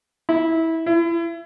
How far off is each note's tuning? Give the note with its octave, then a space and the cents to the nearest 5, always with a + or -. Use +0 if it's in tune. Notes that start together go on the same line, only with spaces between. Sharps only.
E4 -20
E4 +30